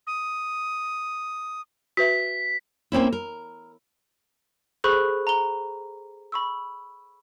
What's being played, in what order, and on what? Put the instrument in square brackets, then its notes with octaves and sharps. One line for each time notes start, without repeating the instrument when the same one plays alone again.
[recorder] D#6
[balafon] F#4 B4 E5 [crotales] B6
[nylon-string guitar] A#3 C4 C#4 E4
A#4
[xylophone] G#4 A4 C5 B5 C#6 F#6
A#5 G7
B5 C#6 E6